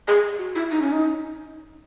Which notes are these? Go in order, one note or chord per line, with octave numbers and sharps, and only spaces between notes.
G#4
F#4
E4
D#4
C#4
D#4